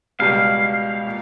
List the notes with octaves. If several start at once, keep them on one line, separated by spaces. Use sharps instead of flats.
C#2 B2 G3 F5
A#2